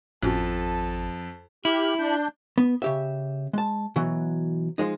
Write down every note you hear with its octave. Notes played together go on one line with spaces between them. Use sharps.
G#1 F2 A2 C#4 F#4 A4 A5
E4 G4 F6
D4 G6
B3
C#3 G4 E5
G#3 A5
B2 E3 F#3
F3 F#3 G#3 D#4